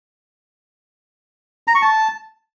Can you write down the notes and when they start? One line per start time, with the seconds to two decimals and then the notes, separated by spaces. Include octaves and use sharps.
1.68 A#5
1.75 C#6
1.82 A5